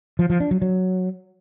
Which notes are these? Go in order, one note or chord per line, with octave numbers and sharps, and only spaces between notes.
F3
F3
D4
F#3
F#3